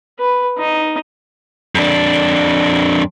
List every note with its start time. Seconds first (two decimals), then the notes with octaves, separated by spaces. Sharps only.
0.19 B4
0.58 D#4
1.75 F2 D4